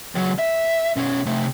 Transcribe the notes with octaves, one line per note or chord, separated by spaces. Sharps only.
C#2 F#3
E5
B2 C#4
C3 A3